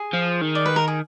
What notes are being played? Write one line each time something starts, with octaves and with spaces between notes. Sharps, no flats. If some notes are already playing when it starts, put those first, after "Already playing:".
Already playing: G#4
F3
D#3
D5
B4
A#4
G#4